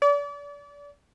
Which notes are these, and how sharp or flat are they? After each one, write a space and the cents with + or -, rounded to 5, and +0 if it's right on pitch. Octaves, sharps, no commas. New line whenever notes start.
D5 -35